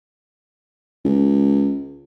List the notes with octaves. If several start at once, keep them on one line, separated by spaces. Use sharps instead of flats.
C#2